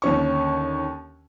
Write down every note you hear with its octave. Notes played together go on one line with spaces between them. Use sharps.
D#2 D3 C#4 C#6